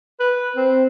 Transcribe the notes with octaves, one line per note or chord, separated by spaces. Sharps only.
B4
C4